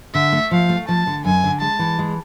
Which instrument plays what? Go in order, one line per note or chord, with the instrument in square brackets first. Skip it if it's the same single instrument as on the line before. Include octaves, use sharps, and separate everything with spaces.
[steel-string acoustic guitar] D3 [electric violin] E5
[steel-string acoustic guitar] A3
[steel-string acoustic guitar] F3 [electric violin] F5
[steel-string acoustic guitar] A3
[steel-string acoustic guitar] F3 [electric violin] A5
[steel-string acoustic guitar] D3
[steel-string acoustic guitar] F#2 [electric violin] G#5
[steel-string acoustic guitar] D3
[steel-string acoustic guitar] G#3 [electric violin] A5
[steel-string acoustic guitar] E3
G#3